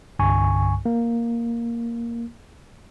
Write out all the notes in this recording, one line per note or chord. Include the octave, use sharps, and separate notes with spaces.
C2 G2 D3 G#5 C#6
A#3